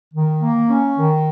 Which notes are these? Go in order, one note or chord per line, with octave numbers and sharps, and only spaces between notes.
D#3
A#3
C#4
D#3